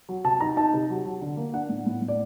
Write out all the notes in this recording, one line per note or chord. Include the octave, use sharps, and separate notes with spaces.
F#3
C3 A5
D#4 A#5
D#4 A5
C3
F#3
F#3
D3
A#3
D4 F#5
A2
A2
A2
D5